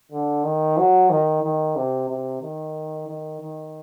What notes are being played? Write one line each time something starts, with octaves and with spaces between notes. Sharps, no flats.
D3
D#3
F#3
D#3
D#3
C3
C3
D#3
D#3
D#3